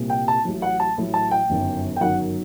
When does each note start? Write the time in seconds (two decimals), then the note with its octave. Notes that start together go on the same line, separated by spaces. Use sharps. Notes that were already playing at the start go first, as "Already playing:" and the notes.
Already playing: C2 A#2 G3
0.10 G5
0.28 A5
0.45 A1 A2 F#3
0.62 F#5
0.80 A5
0.97 A1 A2 F#3
1.14 A5
1.31 G5
1.49 G1 F#2 D#3 F#3
1.96 G5
2.01 G1 F#2 D#3 F#3 F#5